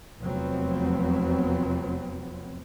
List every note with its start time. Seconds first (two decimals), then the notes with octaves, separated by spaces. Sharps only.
0.21 F1 E2 F3 F#3 B3 C4